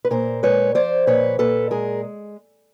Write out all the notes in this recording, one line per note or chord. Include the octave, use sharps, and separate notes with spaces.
B4
A#2 A#4 C5
G#3 B4 C#5
F3 C5 D5
A#2 B4 C#5
A#2 A4 B4
G#3 G#4 A#4